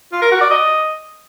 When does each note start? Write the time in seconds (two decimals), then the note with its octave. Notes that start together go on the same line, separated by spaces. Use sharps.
0.12 F4
0.22 A#4
0.31 F#4
0.41 D5
0.50 D#5